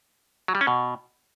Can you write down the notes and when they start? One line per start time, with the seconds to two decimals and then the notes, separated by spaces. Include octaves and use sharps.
0.48 F#3
0.55 G3
0.61 C#4
0.67 B2